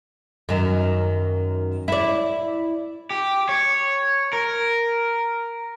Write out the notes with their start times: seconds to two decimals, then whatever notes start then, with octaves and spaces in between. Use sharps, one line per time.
0.49 F#2 D#3
1.88 E4 D5
3.11 G4
3.49 C#5
4.33 A#4